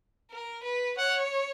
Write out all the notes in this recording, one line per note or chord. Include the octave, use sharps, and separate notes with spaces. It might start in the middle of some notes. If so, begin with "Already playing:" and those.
A#4
B4
C#5 F#5